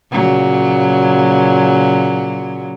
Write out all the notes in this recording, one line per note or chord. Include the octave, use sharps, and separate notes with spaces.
A#2 C#3 F#3